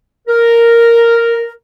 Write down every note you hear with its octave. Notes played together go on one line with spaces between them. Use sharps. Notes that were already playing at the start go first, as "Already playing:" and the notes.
A#4